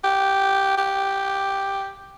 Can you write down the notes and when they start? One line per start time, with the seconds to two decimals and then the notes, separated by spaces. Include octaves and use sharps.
0.04 G4
0.77 G4